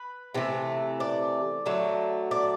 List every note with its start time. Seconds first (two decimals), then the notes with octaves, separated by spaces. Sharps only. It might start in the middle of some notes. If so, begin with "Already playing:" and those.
Already playing: B4
0.34 C3 E3 A3
1.00 D5
1.66 D3 F#3 A3
2.31 D5